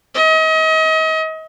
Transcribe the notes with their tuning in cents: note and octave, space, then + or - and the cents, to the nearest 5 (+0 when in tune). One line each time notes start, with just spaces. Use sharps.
D#5 +35